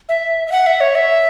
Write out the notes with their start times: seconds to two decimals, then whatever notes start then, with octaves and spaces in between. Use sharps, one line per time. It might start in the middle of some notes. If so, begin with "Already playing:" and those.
0.09 E5
0.47 E5
0.52 F#5
0.66 E5
0.81 C#5
0.95 E5